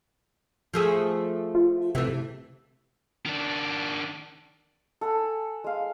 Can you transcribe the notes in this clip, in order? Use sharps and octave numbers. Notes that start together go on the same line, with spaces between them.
F3 A3 G#4
F4
C3 E3 A3
D#3 D4
A4 F#5 G#5 B5
G#3 F5